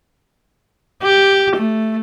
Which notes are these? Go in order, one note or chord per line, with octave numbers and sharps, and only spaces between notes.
G4
A3